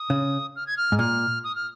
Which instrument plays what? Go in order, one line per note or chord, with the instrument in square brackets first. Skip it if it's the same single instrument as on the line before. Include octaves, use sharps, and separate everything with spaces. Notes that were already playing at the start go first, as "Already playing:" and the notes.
Already playing: [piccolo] D#6
[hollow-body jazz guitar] C#3
[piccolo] F6
G#6
F6
[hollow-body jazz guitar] G#2
[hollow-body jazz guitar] A#2 [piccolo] F6
[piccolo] D#6
F6